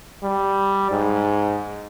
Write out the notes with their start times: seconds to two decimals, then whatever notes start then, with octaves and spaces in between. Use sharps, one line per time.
0.23 G3
0.91 G#2